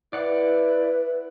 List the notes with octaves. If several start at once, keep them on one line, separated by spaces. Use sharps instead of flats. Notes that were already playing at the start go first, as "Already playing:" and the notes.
E4 B4 D5 F#5 D6